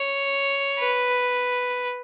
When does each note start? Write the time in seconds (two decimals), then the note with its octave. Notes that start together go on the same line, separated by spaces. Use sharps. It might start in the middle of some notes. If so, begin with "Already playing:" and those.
Already playing: C#5
0.80 B4